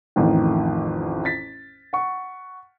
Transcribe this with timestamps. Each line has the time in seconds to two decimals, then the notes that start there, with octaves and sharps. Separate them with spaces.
0.16 A1 F2 A2 D#3
1.25 A6 B6
1.93 F#5 C#6